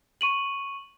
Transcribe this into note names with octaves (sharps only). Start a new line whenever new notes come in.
C#6 D#7 F#7